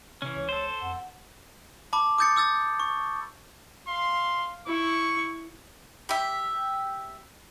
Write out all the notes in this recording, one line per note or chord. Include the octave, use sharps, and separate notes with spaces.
C3 E3 C#4
C#2 C#5
A4 C5
F2 F#5
A5 B5 D6
D6 D#6 G6 A6 C#7
D6 E6 G6 A6
C#6
F5 C6
E4 C#6
G4 E5